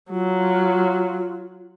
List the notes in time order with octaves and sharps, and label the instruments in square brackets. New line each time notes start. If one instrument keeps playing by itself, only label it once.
[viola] F#3 [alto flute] F4